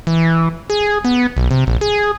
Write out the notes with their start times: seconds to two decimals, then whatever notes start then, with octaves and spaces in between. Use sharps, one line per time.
0.07 E3
0.70 G#4
1.05 B3
1.37 B1
1.51 C3
1.67 A#1
1.81 G#4